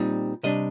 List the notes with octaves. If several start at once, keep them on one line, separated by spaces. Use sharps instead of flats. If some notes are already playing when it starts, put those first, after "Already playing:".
Already playing: A#2 G3 C4 D#4
C3 G3 D4 D#5